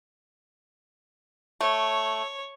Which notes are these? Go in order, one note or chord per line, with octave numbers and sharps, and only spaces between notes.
A3 C#5